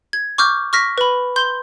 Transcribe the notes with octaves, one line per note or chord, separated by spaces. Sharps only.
G#6
C#6 D6 F6 G6
C#6 F6 A#6 B6
B4 B5
C6 G6 G7